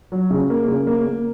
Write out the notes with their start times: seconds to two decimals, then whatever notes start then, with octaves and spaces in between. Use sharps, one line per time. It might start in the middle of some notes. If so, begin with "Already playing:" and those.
0.12 F#3
0.31 C#3
0.50 A#3
0.68 C#3
0.87 A#3
1.07 A#3